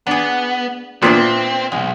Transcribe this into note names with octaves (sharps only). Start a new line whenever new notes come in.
B3 D4 G#4
A#2 B3 C4 D4 E4
B1 G#3